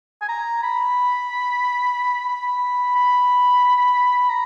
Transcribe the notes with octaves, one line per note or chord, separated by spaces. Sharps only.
G#5
A#5
B5
B5
B5
A#5